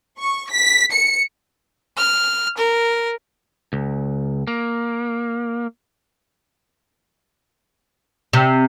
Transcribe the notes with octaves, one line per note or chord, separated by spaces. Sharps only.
C#6
B6
C#7
F6
A#4
C#2
A#3
C3